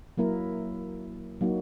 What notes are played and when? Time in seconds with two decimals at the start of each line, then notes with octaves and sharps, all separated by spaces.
0.17 F#3 A#3 E4 A#4
1.41 F#3 A#3 D#4 F#4